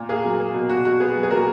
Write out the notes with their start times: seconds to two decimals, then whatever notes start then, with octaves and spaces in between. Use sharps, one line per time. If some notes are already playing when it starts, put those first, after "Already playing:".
Already playing: A#2
0.09 A#3 G#4
0.24 F#3
0.40 A#3
0.54 B2
0.69 B2 F#4
0.85 B2 F#4
1.00 B3 G#4
1.16 F#3
1.23 G#4
1.30 A#2 F#4 A#4